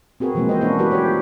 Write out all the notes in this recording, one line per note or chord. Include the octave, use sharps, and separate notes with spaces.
C4 F#4 G#4 A#4 B4
B2 E3 F3 G#3 A#3 C4
C5 D#5
A#3 B3 C#4 D4 E4 F#4
G3 E4 F#4 G4 A#4 B4
F4 G4 A#4 C5 C#5